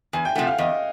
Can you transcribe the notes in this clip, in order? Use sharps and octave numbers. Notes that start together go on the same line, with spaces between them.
E2 G#5
G5
C3 F3 A3 F#5
F5
E2 D#5